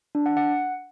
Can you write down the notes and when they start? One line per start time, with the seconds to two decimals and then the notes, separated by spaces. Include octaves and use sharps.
0.15 D4
0.26 F#5
0.37 F#5